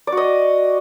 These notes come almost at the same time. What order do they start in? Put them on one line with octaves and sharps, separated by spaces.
D5 F#4 D#5